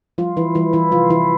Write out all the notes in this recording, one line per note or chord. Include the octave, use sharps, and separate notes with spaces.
F3 G3 F4
E3 E4
E3 G3 E4
E3 E4
C3 F3 F4
E3 E4